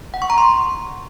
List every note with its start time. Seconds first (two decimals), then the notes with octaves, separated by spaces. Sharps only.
0.14 F#5
0.22 C#6
0.30 A#5
0.38 C6